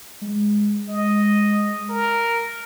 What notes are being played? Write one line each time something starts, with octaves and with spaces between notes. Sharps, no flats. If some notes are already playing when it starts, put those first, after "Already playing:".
G#3
D#5
A#4